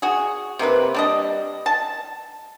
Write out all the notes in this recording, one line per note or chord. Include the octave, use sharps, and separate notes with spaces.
F#4 G#4
C3 A#3 E4 B4
G3 D4 D#5
A5